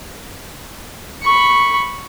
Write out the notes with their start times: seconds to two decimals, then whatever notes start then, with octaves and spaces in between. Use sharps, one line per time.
1.22 B5 C#6